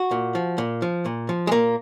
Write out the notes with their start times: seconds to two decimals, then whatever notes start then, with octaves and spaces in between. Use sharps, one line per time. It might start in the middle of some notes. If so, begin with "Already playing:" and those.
Already playing: F#4
0.11 A#2
0.35 F3
0.58 A#2
0.82 F3
1.06 A#2
1.29 F3
1.47 G#3
1.51 A#2 A#3